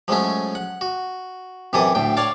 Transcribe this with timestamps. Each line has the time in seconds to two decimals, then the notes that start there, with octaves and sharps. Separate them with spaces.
0.08 F3 F#3 G#3 A3 C#4
0.55 F#5
0.81 F#4
1.73 F#2 C3 E3 E4 A4 D#6
1.95 D2 A2 G5
2.17 C#5 D5 F5 A5